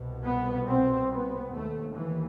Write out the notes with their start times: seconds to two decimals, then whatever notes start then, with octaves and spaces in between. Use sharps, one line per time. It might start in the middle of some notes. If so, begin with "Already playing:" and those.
Already playing: C2 B2
0.24 B3
0.68 C4
1.11 B3
1.53 D#2 A3
1.96 E3